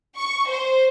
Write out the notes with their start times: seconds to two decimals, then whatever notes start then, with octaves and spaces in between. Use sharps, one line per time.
0.17 C#6
0.48 C5